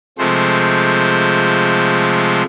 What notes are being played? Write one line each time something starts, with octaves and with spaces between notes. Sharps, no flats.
C3 F3 G#3 A3 C5